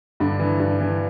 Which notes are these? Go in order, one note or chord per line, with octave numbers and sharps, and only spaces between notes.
G2 D3 D4
E3
G2
E3